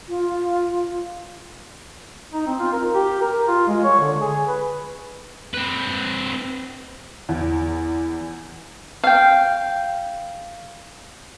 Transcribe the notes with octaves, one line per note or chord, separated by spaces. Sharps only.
F4
D#4
C4
F4
A#4
G4
A#4
F4
G#3
C#5
D3
G#4
B4
C4 B4
E2
F5 G5